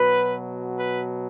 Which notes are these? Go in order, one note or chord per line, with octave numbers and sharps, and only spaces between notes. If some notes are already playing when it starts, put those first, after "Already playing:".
Already playing: B2 F#3 B4
B4